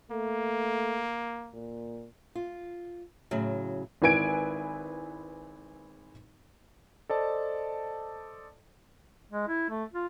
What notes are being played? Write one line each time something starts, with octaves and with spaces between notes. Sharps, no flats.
A3 A#3
A#2
F4
A2 C#3 F#3
G#1 E4 B4 G#5 G#6 D7
A4 C5 D5 D#5 A5
G#3
E4
A3
F4